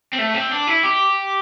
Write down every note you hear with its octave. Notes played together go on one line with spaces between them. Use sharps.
C4
A3
C4
D4
E4
G4